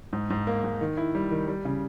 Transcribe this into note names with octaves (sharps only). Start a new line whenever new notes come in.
G#2
G#2
A#3
G#2
D#3
E4
G3
D#3
G3
C#3